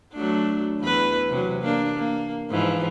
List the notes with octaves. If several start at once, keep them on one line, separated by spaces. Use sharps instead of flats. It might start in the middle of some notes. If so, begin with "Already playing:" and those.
F#3 A3 D4
E2 E3 B4
C3 F#3
A#3 D4
A#3
G#2 E3 F3